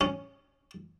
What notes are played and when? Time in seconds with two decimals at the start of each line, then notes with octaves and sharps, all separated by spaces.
0.01 C#4